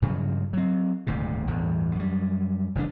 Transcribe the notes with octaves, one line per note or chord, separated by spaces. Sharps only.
G2 C#3 F3 F#3
F#3 C4
D#1 D2 G#2 C3
A1 E2 G2
F#2 G3
F1 C#3 E3 D4